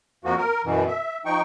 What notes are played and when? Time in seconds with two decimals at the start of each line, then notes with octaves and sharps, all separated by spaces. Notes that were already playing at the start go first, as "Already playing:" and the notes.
0.25 F2 F3 A#3 F#4
0.37 A#4
0.65 F#2 B2 E3
0.88 E5
1.25 F3 D#4 G5 C#6